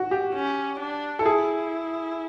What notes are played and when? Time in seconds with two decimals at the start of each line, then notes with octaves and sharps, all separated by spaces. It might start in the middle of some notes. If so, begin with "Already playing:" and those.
Already playing: F#4
0.11 G4
0.34 C#4
0.79 D4
1.19 A4
1.25 E4 G#4